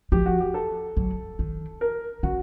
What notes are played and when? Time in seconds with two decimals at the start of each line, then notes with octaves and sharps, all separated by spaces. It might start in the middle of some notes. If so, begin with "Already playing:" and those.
0.12 F3 G4
0.26 F#4
0.40 G4
0.54 A4
0.97 F#3
1.39 D#3
1.81 A#4
2.23 C#3 F#4